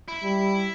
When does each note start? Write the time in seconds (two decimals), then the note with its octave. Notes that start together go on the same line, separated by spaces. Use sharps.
0.08 E4
0.23 G3